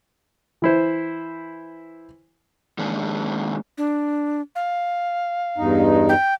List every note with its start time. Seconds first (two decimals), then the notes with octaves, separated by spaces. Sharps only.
0.62 E3 E4 C5
2.79 D#3 G#3 A#3 C#4 D4
3.78 D4
4.56 F5
5.58 E2 G2 D#4
6.09 G5